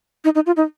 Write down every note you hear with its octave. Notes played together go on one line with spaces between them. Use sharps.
D#4
D#4
F4
D#4